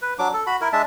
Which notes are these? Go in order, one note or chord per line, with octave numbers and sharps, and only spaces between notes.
B4
F#3 D4 D6
A4
F#4 B5
E4 A#4
G#3 D4 E5 A5